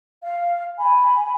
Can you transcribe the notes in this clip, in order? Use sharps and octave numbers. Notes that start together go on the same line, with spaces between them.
F5
G#5 B5